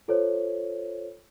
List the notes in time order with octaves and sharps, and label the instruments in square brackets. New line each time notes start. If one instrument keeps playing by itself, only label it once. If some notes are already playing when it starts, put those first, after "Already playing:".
[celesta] F4 A4 C5 C#5